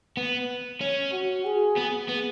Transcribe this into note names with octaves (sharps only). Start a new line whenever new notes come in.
B3
C#4
F#4
G#4
B3
B3